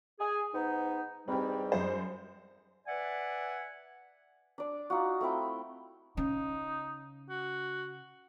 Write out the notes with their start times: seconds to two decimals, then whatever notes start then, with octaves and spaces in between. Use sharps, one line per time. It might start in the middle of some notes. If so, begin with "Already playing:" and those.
0.20 G#4
0.53 G#2 B3 D#4
1.28 E2 G#2 G3 C4 G4
1.72 F#2 C5
2.87 B4 D5 E5 F#5 G#5
4.58 D4 D5
4.90 D#4 F4 F#4
5.21 A3 C4 E4 G5
6.17 C#3 D#4
7.29 F#4